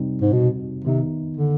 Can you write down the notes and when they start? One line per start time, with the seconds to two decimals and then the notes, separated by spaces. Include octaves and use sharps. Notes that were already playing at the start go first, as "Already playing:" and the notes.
Already playing: C3 G3 C4 D#4
0.22 G#2
0.33 B2
0.84 C3 D#3 B3 D#4
1.37 D3